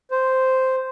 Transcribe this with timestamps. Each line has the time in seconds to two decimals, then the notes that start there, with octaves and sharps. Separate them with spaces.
0.11 C5